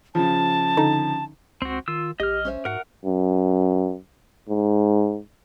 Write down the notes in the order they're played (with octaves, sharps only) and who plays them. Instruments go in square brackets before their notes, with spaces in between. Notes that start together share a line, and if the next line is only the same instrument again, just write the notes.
[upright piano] C#3 F3 [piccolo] A5
[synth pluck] D3 D#4 A#5
[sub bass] C#2 [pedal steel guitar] C4 F#4
[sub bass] D#3 [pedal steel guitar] F4 E6
[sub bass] A#1 [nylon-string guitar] G4 [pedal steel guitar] D#5 F6
[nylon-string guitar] C#4 C5 E5
[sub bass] G#2 [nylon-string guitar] F#4 [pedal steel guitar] A#4 F#5
[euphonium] F#2
G#2